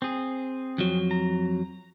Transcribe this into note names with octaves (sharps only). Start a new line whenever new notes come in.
C4 G#4
F2 F#3
A#5